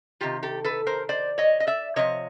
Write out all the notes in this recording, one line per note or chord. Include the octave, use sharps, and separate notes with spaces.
C3 D#3 F4 G4
G4 A4
A4 B4
A#4 C5
C5 D5
C#5 D#5
D#5
D5 E5
C3 F3 C#5 D#5